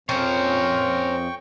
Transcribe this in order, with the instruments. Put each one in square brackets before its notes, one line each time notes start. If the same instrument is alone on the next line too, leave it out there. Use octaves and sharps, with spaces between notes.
[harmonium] F2 F3 [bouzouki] C#4 [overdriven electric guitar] A#4 C5 [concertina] G5 C#6